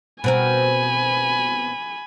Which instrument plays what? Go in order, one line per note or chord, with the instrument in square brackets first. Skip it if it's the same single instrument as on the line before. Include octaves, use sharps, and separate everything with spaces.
[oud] B2 C4 A#4 [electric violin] G#5 B5